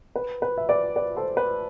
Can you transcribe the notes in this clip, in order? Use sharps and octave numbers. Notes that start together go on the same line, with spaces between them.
B4
B4
E5
B4 D5
B4 D5
A4 C5
B4